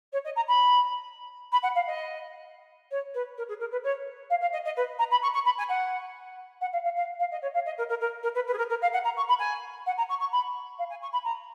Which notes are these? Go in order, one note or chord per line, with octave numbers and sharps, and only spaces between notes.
C#5
D#5
A#5
B5
B5
F#5
F5
D#5
C#5
B4
A#4
G#4
A#4
B4
C#5
F5
F5
D#5
D#5
B4
A#5
B5
C#6
C#6
B5
G#5
F#5
F#5
F5
F5
F5
F5
D#5
C#5
F5
D#5
A#4
A#4
A#4
A#4
B4
B4
G#4
A#4
A#4
F5
F#5
A#5
C#6
B5
G#5
F#5
A#5
C#6
C#6
B5
F5
G#5
C#6
B5
A#5